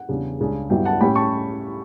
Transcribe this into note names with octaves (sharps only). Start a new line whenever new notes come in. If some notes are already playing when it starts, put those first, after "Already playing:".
Already playing: F#5
E2 C#3 G3 D4
C#2 C#3 G3 D4
G2 F#3 B3 E4 G5
F#5 A5
A2 G3 C#4 G5 B5
A5 C#6